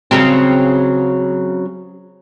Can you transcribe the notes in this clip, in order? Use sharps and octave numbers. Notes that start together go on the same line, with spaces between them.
C#3 F#3 C4